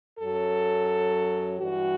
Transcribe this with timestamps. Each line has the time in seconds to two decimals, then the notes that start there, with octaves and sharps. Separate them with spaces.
0.19 F#2 F#3 A4
1.59 G2 E3 G3 F#4